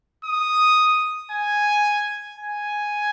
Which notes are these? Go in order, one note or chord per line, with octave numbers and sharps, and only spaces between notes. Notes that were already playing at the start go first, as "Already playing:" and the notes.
D#6
G#5
G#5